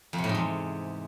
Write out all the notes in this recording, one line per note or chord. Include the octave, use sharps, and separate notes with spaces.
F2
C3
A2
G#2
E2